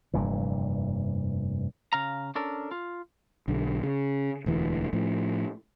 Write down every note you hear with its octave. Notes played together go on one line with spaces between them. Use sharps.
F1 G2 A#2 E3
C#3 F5 A#5
C#4 D4 A4 A#4
F4
B1 D3
C#3
E1 D2 E3
A2 F3